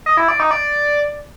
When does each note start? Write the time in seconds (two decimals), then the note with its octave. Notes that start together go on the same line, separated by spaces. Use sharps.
0.06 D#5
0.17 E4
0.28 D5
0.40 D#4
0.51 D5